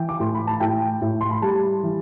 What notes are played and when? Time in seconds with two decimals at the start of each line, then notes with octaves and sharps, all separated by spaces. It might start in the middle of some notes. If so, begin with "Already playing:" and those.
Already playing: E3 G5
0.09 D6
0.20 A2 C6
0.35 B5
0.47 A5
0.60 A2 G5
1.02 A2
1.21 C6
1.31 B5
1.42 G3 A5
1.83 E3